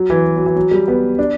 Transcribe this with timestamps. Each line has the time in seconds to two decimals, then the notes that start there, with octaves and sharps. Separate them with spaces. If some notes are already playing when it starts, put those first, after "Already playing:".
Already playing: F#3
0.10 E3
0.36 F#3
0.46 E3
0.56 F#3
0.71 G3
0.88 B3
1.19 D4